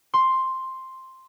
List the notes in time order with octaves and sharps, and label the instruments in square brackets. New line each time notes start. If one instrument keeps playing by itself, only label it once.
[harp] C6